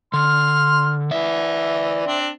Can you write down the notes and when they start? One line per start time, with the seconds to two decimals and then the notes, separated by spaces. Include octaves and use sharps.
0.13 D3 C6 F6
1.11 E3 D5 E5
2.06 C4 D4